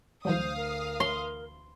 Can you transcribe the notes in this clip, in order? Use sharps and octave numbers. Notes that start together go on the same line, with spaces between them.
D2 E3 F#3 G3 C5 F5 D#6
A#4
C#5 C6